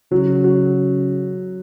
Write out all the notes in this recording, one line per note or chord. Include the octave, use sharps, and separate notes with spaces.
C#3 F#3
F#3